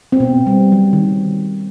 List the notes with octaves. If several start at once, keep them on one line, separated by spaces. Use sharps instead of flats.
C4
B2 B3
G3
F#3
D#3